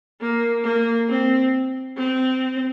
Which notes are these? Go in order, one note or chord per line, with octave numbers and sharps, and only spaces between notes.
A#3
A#3
C4
C4